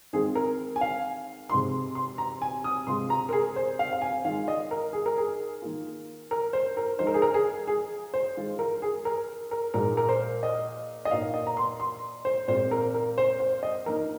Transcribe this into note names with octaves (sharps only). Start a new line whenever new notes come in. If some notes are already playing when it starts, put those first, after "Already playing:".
D#3 G#3 C4 F4 G#4
A#4
G#5
F5
C3 F3 G#3 D#4 C6
C6
A#5
G#5
D#6
C3 G#3 F4 C6
A#5
A#4
G#4
C5
F5
F5
G#5
D#3 G#3 F4 F5
D#5
A#4
G#4
A#4
G#4
D#3 A#3 F4
A#4
C5
A#4
F3 G#3 D#4 C5
A#4
G#4
A#4
G#4
G#4
C5
D#3 G#3 F4
A#4
G#4
A#4
A#4
A#2 F3 G#3 D#4 A#4
A#4
C5
D#5
D#5
A#2 A#3 D#4 F5
D#5
A#5
C6
C6
C5
A#2 G#3 C4 F4 C5
A#4
A#4
C5
C5
D#5
F3 A#3 D#4 A#4